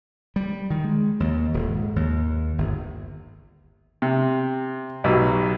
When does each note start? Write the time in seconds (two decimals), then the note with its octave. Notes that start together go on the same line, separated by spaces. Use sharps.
0.36 G3
0.70 D#3
0.84 G#3
1.20 D#2
1.54 D#1
1.68 G#2
1.96 D#2
2.58 G1
4.02 C3
5.04 B1 B2 F#3 G4 E6